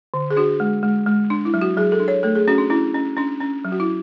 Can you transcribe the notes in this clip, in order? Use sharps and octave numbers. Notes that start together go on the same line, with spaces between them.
D3
G#4
D4 F#4
G#3
G#3
G#3
D4
E4
F#3
F#4
F#3 G#4
A4
D4
C#5
A3 A4
G#4
C#4 F#4
D4
C#4 E4
C#4
C#4 D4
C#4
F#3
F#4
E4